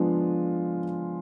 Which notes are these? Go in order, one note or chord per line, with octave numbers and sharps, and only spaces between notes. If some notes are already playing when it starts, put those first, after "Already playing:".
Already playing: F3 G#3 B3 D4 F4